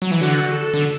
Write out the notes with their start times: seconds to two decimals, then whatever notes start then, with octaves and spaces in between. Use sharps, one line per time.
0.02 F#3
0.11 E3
0.21 D3 F#4
0.52 A4
0.74 D3